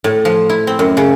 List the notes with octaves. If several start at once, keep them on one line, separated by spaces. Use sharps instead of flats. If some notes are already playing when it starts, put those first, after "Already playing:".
A2
F3
E4
C4
F#2
C#3